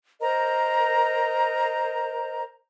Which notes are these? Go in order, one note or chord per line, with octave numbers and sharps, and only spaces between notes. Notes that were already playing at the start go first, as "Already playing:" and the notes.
A#4 C5 D#5 A#5